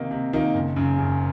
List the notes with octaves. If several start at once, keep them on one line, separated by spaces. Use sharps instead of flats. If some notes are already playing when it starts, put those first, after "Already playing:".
Already playing: C3 D#3 A#3 D#4
C3
D#3 A#3 D#4
F#1
F#2 C#3
F#1